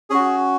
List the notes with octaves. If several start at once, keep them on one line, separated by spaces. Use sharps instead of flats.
C#4 F#4 G#4